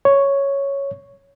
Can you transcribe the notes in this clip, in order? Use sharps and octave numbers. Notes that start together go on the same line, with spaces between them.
C#5